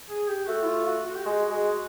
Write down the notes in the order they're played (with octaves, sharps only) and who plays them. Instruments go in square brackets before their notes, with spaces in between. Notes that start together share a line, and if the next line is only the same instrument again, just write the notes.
[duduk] G#4
G4
[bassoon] A3 [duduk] F#4
[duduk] E4
F4
F#4
F#4
G4
[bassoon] G#3 [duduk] F#4
[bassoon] G#3